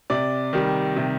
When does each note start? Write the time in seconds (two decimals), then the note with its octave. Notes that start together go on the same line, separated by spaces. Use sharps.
0.10 C3 D5
0.53 D#3 G3
0.96 C3